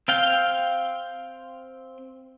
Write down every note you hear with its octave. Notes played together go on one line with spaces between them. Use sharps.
C4 F5 G5